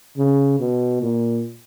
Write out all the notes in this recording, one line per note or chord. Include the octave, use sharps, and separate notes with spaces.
C#3
B2
A#2